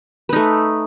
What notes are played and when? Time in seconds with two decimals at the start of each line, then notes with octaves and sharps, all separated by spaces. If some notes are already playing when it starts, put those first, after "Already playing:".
0.29 B4
0.33 D#4
0.36 A3